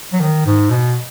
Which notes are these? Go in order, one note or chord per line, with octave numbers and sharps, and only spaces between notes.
F#3
D#3
G#2
B2